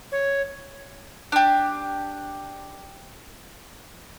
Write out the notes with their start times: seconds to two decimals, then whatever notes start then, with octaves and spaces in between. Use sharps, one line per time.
0.12 C#5
1.32 D4 G4